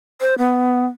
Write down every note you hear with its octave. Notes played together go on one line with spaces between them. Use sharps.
C5
B3